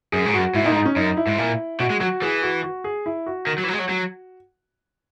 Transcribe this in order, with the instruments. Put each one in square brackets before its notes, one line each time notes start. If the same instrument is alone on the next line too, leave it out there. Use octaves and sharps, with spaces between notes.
[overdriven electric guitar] F#2 [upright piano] G#4
[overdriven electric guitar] G#2
[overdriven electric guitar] F#2 [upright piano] F#4
[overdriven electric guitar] G#2 [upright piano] E4
[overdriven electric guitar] A#2 [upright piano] D#4
[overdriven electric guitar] G#2
[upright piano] D#4
C#4
[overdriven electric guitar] F#2 [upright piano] D#4
[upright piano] E4
[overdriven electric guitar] G#2
A#2
[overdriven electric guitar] B2 [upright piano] F#4
[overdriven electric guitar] G#3
[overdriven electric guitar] F#3 [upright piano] F#4
[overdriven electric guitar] E3 [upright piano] G#4
[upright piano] F#4
F#4
G#4
E4
F#4
[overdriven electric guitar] D#3
F#3
E3
F#3
G#3
F#3
F#3